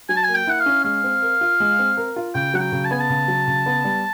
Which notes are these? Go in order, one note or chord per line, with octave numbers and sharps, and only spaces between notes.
F#3 G#5
A5
A#3 G#5
G5
E4 F#5
F5
C#4
G#3 F5
C4
A#4
F4
G#3
C4
A#4
F4
C#3 G5
F#3 F#5
G5
C#3
A5
B3 G#5
A5
C#3
F#3
C#3
B3
G3